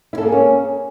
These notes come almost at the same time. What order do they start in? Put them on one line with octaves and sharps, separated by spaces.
E4 A4 A#3 G#4 C#4